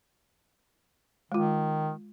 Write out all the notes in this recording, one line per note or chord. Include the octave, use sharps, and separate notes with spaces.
D#3 G#3 F4